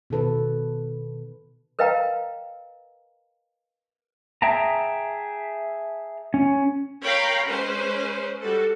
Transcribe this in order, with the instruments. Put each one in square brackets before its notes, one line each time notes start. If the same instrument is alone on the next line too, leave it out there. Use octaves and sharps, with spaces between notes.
[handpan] B2 D#3 A4 B4
[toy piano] A#4 B4 D#5 F5 G5 A#5
[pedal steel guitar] G#4 E5 G5 A5 A#5
C#4
[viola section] A#4 C#5 F5 G5 A#5 B5
G#3 C#4 G#4 B4 C5
G3 F#4 A4